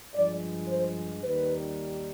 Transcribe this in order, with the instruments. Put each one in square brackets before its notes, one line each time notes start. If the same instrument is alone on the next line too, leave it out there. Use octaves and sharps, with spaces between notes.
[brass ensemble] G2 F3 G#3 D5
C5
D#2 D#3 G3 B4